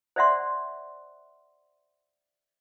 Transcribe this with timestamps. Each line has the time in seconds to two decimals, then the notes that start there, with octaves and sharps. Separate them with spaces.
0.16 C5 D5 E5 F#5 C6